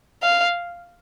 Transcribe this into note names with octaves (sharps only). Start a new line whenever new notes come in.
F5